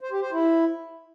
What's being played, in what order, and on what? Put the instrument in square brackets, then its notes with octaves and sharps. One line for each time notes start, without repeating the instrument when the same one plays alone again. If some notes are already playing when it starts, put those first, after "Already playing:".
[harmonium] C5
G4
C5
E4